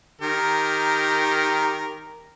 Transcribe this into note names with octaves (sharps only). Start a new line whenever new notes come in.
D#3 G4 A#4